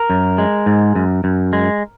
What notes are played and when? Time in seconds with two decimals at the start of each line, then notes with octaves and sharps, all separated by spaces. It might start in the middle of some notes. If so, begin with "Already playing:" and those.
Already playing: A#4
0.10 F#2
0.38 G#3
0.66 G#2
0.95 F#2
1.24 F#2
1.53 G#3